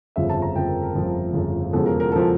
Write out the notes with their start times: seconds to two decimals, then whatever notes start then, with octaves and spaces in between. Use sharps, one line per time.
0.16 G1 F2 C#3 F3 E5
0.29 A5
0.42 A#5
0.56 G1 F2 C#3 F3 G5
0.68 A#4
0.82 A#4
0.95 G1 F2 C#3 F3
1.33 G1 F2 C#3 F3
1.73 E1 E2 C#3 F3 A4
1.86 A#4
2.00 A#4
2.12 C#3 F3 A4